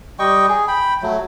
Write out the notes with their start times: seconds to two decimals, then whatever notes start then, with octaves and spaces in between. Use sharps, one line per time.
0.19 G3 D#5 G5 C#6
0.48 G#4
0.68 G5 B5
1.03 F#3 A3